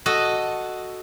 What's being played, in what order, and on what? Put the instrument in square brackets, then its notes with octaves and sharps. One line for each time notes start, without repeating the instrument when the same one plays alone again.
[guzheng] F#4 A4 D#5